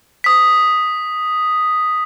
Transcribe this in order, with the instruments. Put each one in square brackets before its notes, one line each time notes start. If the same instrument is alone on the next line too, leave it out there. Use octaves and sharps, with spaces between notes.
[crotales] D#6 B6